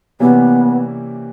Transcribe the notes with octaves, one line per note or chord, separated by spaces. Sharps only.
C3 E3 G3 A#3 B3 C#4